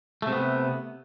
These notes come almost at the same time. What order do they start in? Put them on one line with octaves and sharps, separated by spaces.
A3 C3 B3